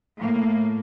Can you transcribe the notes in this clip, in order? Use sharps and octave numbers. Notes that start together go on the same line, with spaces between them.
A2 A#3